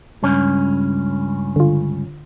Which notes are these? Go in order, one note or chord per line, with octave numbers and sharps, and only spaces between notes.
C#2 G2 C#4
D3 F4